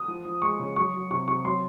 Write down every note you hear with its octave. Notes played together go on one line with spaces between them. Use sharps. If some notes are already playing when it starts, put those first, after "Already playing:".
Already playing: D#6
F3
F3
G#3 C#6
C#3
F#3 C#6
F#3
C3 C#6
C3 C#6
F#3 C6